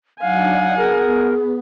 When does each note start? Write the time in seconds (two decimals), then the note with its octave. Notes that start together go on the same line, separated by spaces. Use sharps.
0.21 F#3 D4 D#4 F5 F#5 G#5
0.78 B3 G#4 A#4